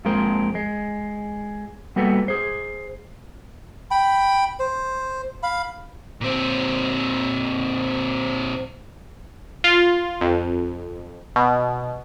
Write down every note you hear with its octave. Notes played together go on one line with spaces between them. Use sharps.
F2 F3 G#3 A#3 A#4 C5
G#3
G3 A#3 B3 F#4 A4 B4
G#4 C5
G5 B5
C5
F5 B5
A#2 C4
F4
F2
B2